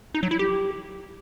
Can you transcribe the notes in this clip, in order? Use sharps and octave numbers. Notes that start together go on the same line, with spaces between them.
D#4
F#3
E4
G4